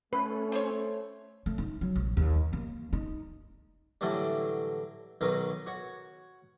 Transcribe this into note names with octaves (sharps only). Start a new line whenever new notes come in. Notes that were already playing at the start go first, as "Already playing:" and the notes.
A3 C#4 B4
C4 C5 C#5
A3
D#4
F#3
A#1
D#2
A#3
D#4
A2 D3 E3 F#3 G3
B1 D#3 F#3 A#4 B4
F#4 C#5